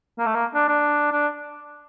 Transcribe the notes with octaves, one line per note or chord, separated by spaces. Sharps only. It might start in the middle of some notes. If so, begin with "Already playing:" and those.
A#3
A3
A#3
D4
D4
D4